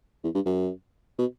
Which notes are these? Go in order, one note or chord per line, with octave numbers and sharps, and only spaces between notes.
E2
G2
F#2
B2